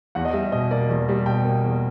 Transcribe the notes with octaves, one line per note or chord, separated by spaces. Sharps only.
E2 F#5
D#5
G3 E5
B2 D#5
A#3 D5
E2
G3
B2 G5
A#3
E2